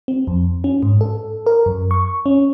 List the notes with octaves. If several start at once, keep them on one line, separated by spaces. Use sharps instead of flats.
C4
F2
C#4
G#2
A4
A#4
F#2
C#6
C#4